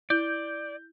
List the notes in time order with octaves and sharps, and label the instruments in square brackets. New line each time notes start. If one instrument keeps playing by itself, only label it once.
[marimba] E4 [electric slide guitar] D5 [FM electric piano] G6